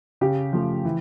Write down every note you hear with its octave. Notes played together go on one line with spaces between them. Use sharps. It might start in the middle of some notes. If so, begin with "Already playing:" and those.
C#3 G4
F3 A3
E3